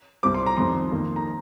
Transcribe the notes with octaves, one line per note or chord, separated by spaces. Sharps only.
C2 C3 G3 C4 D6
C6
A#5
F2 D#3 G3 C4 C6
F2 D#3 A#3
A#5